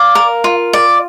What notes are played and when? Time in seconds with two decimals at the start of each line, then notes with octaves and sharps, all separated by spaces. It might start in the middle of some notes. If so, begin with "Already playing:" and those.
Already playing: D5 F5
0.15 A#4
0.44 F4
0.73 D5